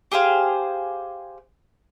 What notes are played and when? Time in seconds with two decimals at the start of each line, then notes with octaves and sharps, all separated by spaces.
0.12 G4 G#4 C5 F5